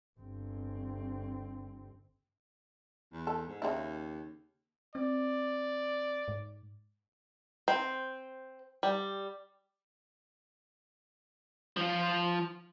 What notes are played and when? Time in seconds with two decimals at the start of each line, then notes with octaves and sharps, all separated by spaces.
0.20 G1 C4
3.13 E2
3.27 A4
3.48 G#2
3.62 D#2 C#3 E4
4.95 C4 D5
6.28 G#2
7.68 C4
8.83 G3
11.77 F3 F4